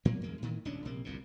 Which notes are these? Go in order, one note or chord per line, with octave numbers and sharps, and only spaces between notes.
A2 F#3 A#3 B3
E2 G2 G#3 A#3
A2 D#3 E3
D#1 C#2 C#4 D4
A#1 C3 A#3
G1 C2 G2 A#2